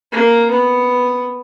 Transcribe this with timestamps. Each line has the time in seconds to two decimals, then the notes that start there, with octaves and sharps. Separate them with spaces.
0.12 A#3
0.50 B3